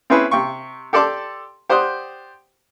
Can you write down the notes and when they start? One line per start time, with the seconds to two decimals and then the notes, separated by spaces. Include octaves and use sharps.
0.10 C4 C#4 E4 G#4 B4
0.31 C3 G5 C#6
0.93 G4 A4 D5 A5 C6 D6
1.69 G4 C5 D5 F#5 D#6